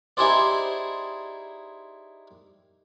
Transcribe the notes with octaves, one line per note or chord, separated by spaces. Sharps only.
D#4 E4 G4 G#4 C5 D5